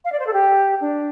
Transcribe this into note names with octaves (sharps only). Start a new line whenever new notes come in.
F5
D5
C5
A4
G4
D4